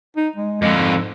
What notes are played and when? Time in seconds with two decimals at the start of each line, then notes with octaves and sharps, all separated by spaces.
0.16 D#4
0.36 G#3
0.62 F2 D3 G#3
0.78 G#2